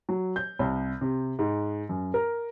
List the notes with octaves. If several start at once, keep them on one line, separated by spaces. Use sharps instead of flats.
F#3
G6
C2
C3
G#2
F#2
A#4